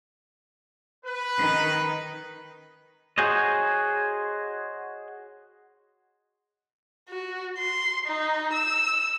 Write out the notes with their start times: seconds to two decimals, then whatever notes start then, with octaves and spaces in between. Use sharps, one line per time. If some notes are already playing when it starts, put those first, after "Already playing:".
1.05 B4
1.36 D#3 D#4
3.18 F#4 G#4 C5 C#5 D#5
7.09 F#4
7.58 C6
8.06 D#4
8.53 E6